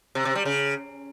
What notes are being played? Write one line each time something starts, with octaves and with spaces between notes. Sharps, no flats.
C3
C3
G3
C#3